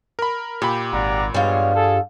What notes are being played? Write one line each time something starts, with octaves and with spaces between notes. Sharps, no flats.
A#4 B5
A#2 G4 B5
G#1 D5 F#5 A#5
G2 G3 G#3 B3 F4 C#5
G#4 A4